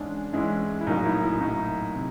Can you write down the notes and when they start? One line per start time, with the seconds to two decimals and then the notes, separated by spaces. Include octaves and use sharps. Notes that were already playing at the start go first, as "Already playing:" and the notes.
Already playing: G#2 E3 G#3 C#4 D4 E4
0.33 G#2 E3 G#3 C#4 E4
0.81 E4
0.87 A#1 A2 F#3 A#3 D#4
1.00 D#4
1.05 E4
1.23 E4
1.40 A#1 A2 F#3 A#3 D#4
1.94 C3